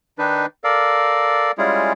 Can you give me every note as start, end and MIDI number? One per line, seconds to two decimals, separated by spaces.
0.18 0.46 51
0.18 0.46 62
0.18 0.46 63
0.18 0.46 71
0.64 1.52 69
0.64 1.52 70
0.64 1.52 74
0.64 1.52 77
1.58 1.93 55
1.58 1.93 56
1.58 1.93 61
1.58 1.93 64
1.58 1.93 65
1.58 1.93 68